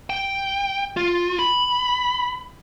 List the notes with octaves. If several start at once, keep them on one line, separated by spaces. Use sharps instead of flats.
G5
F4
B5